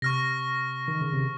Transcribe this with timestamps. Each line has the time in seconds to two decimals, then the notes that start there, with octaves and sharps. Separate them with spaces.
0.02 C3 C#6 F6 A#6
0.88 D#3
1.01 C#3
1.13 C3